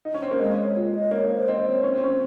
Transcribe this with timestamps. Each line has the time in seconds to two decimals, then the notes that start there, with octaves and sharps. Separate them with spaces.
0.05 D#4
0.14 C#4
0.22 C4
0.31 A#3
0.40 G#3 D#5
0.57 C#5
0.76 F4
0.94 D#5
1.11 A#3 C#5
1.29 C5
1.48 C4 D#5
1.66 C#5
1.83 C#4 C5
1.94 C4
2.04 C#4